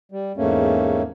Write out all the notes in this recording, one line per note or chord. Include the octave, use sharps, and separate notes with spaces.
G3
E2 G#2 A3 A#3 C#4